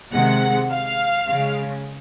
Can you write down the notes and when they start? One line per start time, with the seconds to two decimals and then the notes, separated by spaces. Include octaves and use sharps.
0.12 C3 D#3 G#3 F#5
0.71 F5
1.29 C#3 G#3